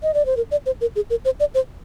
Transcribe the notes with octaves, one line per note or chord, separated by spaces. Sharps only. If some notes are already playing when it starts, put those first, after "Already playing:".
D#5
D5
C5
A#4
D5
C5
A#4
G#4
A#4
C5
D5
C5